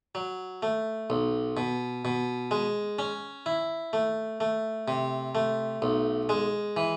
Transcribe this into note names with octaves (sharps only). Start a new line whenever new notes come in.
F#3
A3
B1
B2
B2
G#3
C#4
E4
A3
A3
C3
A3
B1
G#3
E3